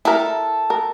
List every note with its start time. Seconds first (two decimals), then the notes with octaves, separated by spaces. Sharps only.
0.05 E4 A4 A#4
0.70 A#4